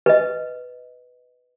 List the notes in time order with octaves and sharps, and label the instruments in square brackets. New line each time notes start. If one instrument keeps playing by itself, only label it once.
[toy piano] B4 D#5